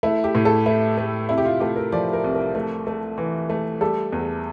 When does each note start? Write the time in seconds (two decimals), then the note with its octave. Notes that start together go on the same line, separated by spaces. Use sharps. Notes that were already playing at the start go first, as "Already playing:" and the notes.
0.03 A3 E4
0.24 G4
0.35 A2
0.45 A4
0.66 A3 E4
0.98 A3
1.29 C3 E4
1.38 G4
1.45 F4
1.60 A3 G4
1.76 A#4
1.92 F3 D5
2.13 A#4
2.24 C2
2.34 A#4
2.55 A3
2.87 A3
3.18 E3
3.50 A3
3.81 G3 A4
4.13 E2